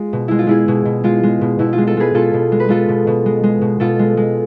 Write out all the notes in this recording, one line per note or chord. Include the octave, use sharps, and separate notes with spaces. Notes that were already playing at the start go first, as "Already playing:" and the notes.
Already playing: G#3 F4
B2
G#3 E4
F4
G#3 E4 G#4
B2
B2
G#3 F4
G#3
B2
B2 E4
F4
G#3
F4 A4
G#3 G#4 B4
B2 F4 A4
B2
G#3
B4
G#3 F4 A4
B2
B2
G#3
G#3
B2
B2 F4 A4
G#3
G#3